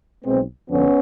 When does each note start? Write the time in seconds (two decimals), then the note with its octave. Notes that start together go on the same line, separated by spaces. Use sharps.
0.25 B1 B2 G#3 B3 C4
0.69 G1 F2 D3 F3 B3 C#4